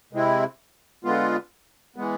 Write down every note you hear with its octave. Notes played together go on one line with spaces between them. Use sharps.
C3 G#3 C4 E4
D3 G#3 B3 F4
E3 G#3 B3